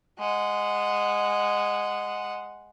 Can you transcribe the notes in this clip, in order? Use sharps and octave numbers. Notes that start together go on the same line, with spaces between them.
G#3 F#5